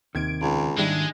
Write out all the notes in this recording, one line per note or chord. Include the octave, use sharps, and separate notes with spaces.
D#2 C3 D#3 G#6 D7
C#2
D#2 G#2 D#3 G3 G#3 D4 E4